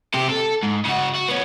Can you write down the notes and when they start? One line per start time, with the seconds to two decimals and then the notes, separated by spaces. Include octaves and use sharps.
0.14 C3 G4
0.29 A4
0.63 G#2
0.85 C#3 F#4
1.15 F#4
1.28 B3 C#4